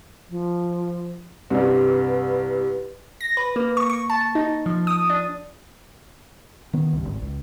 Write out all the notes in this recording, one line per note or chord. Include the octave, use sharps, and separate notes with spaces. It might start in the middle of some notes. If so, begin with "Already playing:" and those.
F3
C2 G2 B4
A#6
B4
A#3
C#6
C#6
A5
D#4
F3
D#6
D4
D#3 B3
C#2 G2
G#1
C#2